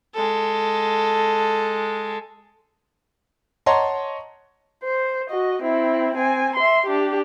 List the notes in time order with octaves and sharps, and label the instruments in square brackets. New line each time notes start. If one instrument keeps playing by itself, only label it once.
[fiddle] G#3 A4
[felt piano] C#5 D#5 F#5 A5 A#5 C6
[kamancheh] C5
F#4 D#5
C4 E4
C4 G#5
E5 C6
D4 G4